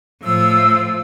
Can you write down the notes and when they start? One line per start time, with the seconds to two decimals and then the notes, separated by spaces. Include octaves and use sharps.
0.22 A2 F3 E6